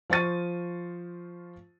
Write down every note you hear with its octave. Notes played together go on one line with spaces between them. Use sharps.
F3 F4 C5 C#6 A6 D#7